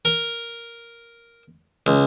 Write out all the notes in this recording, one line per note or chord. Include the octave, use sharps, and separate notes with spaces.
A#4
C#2